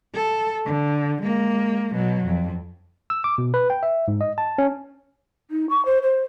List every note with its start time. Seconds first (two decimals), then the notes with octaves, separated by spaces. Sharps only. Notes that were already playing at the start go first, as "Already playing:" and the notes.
0.14 A4
0.66 D3
1.21 G#3 A#3
1.92 B2 F#3
2.25 F2
3.10 E6
3.24 D6
3.38 B2
3.54 B4
3.70 G5
3.83 E5
4.08 G#2
4.21 D#5
4.38 A5
4.58 C#4
5.51 D#4
5.70 C#6
5.85 C5
6.03 C5